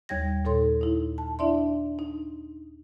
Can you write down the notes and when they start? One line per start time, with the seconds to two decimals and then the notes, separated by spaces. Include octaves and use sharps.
0.09 D#2 G3 C#5 G5 G#6 A#6
0.45 A#2 D#4 A4 C#5 C6
0.81 D#4 E4
1.18 A5
1.39 D4 E4 D5 E5 C6
1.99 D#4